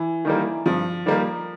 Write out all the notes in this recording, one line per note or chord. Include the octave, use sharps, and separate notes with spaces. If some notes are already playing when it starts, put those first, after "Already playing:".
Already playing: E3
D#3 G3 A#3
G2 F3
D#3 G3 A#3